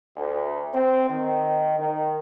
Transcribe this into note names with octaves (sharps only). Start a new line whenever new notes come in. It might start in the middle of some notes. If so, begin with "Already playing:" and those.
D2
C4
D#3
D#3